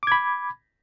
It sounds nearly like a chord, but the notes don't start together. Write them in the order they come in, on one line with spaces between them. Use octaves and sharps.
D6 G#6 B5